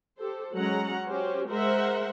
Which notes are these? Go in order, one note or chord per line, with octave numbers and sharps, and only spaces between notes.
G4 A4 C5
F#3 G#3 C#4 F#5 A#5
C#4 F#4 G4 C5
G#3 A#4 C5 E5 F#5